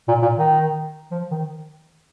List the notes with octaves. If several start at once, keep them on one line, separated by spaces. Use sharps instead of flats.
A#2
A#2
D#3
F3
D#3